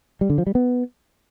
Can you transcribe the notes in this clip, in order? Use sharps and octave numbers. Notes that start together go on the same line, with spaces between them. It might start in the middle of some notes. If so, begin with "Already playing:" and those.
G3
D3
F3
G3
B3